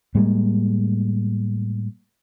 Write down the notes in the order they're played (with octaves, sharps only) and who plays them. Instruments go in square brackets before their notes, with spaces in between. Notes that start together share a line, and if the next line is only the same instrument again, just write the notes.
[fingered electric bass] A2 G3 G#3 A#3